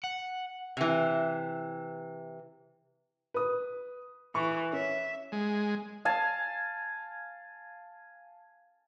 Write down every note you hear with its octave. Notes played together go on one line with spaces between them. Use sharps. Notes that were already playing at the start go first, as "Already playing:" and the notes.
F#5
C3 E3
B4 D#6
E3 C#6
C#4 E5
G#3
F5 G#5 A5